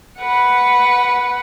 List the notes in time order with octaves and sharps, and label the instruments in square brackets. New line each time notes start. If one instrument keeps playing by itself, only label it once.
[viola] B4 F#5